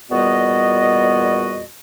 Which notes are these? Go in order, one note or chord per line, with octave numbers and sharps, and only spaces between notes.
E2 A#2 G3 B3 F#4 D#5